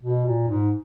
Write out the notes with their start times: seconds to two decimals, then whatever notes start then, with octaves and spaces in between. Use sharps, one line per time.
0.03 B2
0.26 A#2
0.48 G#2